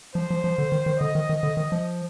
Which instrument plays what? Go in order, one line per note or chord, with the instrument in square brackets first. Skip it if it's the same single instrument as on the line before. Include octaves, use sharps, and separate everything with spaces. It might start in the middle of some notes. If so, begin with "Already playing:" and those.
[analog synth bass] F3 [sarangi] C5
[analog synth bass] F3
F3
D3
D#3
D#3
[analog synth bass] D3 [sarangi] D#5
[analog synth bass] D#3
D#3
D3
D#3
F3